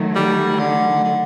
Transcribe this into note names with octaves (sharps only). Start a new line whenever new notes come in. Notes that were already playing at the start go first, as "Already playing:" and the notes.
Already playing: D#3 F#3 A3
G3
D3
D3